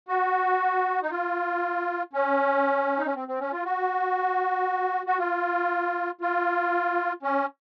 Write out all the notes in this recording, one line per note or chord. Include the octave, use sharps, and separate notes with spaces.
F#4
D#4
F4
C#4
D#4
C#4
C4
C4
C#4
F4
F#4
F#4
F4
F4
C#4